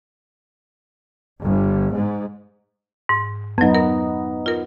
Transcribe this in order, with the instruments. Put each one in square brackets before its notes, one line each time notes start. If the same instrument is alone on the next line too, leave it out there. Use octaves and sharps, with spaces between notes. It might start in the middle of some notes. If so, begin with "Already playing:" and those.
[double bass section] G1
G#2
[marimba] G#2
[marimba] F2 F#3 [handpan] B3 D#4
[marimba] A#4
F4 A#4